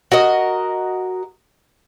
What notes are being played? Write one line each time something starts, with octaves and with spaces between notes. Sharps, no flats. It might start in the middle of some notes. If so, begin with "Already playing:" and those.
F#4 A#4 D#5